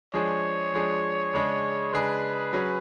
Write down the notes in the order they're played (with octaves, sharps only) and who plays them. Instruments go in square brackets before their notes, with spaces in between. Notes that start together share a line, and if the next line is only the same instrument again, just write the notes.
[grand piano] F3 G#3 D4 G#4 [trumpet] C#5
[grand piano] F3 G#3 D4 G#4
C#3 G#3 D4 G#4
[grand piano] C#3 G#3 D4 G#4 [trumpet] B4
[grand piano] F#3 C#4 G#4